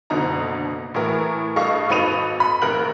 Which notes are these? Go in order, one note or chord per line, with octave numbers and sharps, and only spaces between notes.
F#1 B2 D3 D#4 A#5
A2 E3 A#4
G2 A4 D#5 F5 C#6
G#1 D#4 A4 B4 D#7 F7
B5
A1 D#2 A#4 F#6 F#7